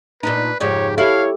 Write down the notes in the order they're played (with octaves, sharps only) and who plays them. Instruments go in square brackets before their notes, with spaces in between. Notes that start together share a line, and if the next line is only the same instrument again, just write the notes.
[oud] A#2 D4 D#4 [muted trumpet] B4
[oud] F2 G#2 C#3 [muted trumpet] G4 [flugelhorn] C#5
[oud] E4 [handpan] G4 A4 [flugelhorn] C#5 [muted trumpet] F5